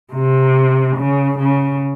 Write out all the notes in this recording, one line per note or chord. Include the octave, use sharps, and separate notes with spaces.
C3
C#3
C#3